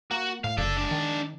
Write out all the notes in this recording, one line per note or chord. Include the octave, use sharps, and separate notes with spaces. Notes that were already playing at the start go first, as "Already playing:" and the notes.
A#3 F#4
A2 F5
F#1 A4 D5
G#3 D4
D#3